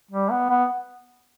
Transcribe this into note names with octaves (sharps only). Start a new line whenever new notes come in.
G3
B3
B3